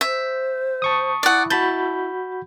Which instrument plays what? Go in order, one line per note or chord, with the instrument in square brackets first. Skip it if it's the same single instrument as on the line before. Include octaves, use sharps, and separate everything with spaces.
[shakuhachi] C5 [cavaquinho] E5
[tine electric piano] A5 C#6 D#6
[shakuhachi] E4 [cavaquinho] D5 F#5
[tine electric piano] F#4 B5 G6 [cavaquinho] A5